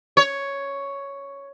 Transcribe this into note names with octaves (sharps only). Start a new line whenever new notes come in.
C#5